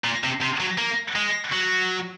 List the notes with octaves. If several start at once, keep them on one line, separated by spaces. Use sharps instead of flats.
A#2
C3
C3
F#3
A#3
G#3
F#3